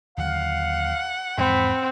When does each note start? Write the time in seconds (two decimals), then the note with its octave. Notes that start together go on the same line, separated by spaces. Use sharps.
0.18 D#2 D3 F#3 F5 F#5
1.38 E2 G#2 F3 C4 B5